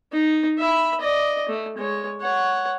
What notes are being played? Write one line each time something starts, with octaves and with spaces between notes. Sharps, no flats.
D#4
E5 B5
D5 D#5
A3
G#3 C#5
C#5 F#5